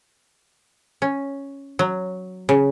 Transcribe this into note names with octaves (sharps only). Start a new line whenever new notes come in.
C#4
F#3
C#3